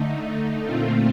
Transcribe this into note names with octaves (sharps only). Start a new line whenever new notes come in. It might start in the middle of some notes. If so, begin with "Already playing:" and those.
Already playing: D3 A3 D#4
A#2 A3 C4 F4